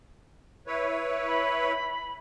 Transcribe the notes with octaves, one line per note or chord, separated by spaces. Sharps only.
E4 B4 C#5
B5